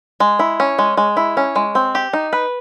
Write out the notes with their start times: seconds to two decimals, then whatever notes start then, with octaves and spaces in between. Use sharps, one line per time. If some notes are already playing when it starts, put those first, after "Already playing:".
0.20 G#3
0.39 E4
0.60 C#4
0.79 G#3
0.97 G#3
1.17 E4
1.37 C#4
1.56 G#3
1.75 C4
1.95 G4
2.13 D#4
2.33 B4